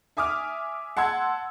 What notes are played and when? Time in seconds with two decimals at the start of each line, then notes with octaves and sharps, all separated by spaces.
0.17 E5 G#5 D6 D#6 F6
0.97 F#5 A5 C6 E6 G#6